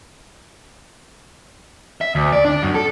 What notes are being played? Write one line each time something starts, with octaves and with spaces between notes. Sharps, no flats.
E5
D2
D5
D4
F#2
A4